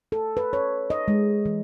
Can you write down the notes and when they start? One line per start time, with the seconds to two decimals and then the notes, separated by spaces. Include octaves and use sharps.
0.12 A4
0.37 B4
0.53 C#5
0.90 D#5
1.08 G#3
1.46 E3